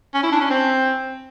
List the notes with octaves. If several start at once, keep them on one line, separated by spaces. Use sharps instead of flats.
C#4
E4
D4
C#4
C4